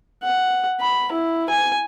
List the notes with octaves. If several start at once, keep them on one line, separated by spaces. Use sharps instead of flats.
F#5
B5
E4
G#5